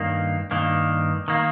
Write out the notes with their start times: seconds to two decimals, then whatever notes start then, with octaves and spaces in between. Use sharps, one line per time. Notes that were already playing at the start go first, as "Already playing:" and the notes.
Already playing: G2 D#3 A#3
0.51 G2 D#3 A#3
1.28 D#3 A#3